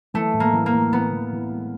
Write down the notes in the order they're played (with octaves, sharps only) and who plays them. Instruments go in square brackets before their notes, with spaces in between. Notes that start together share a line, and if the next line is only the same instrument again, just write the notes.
[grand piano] E3 [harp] A3
[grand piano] A2
[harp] A#3
[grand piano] E3
[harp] A#3
[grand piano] A2
[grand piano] E3 [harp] B3
[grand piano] E3
E3
G#3